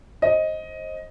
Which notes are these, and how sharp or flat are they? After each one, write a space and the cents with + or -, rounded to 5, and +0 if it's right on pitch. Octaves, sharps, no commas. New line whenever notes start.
C5 +25 D#5 +10